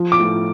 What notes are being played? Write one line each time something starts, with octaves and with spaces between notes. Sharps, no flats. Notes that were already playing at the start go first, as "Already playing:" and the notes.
Already playing: F3
D6
A2